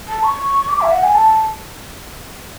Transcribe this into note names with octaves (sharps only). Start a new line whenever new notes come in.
A5
C#6
D6
E5
F#5
G#5
A5